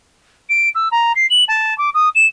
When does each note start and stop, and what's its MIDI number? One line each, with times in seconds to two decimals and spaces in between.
0.49 0.69 98
0.75 0.88 88
0.91 1.12 82
1.16 1.26 96
1.30 1.44 102
1.48 1.77 81
1.78 1.90 86
1.94 2.09 87
2.15 2.26 100